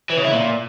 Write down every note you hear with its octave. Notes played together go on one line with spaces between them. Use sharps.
E3
C#3
E4
A#2